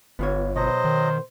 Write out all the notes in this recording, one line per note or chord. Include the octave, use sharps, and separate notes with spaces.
G1 B3 F4 C#5
B2 F#3 B3 C5 D#5
D#3